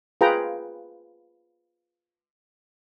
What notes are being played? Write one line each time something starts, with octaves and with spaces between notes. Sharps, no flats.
F4 G#4 B4 G5 A#5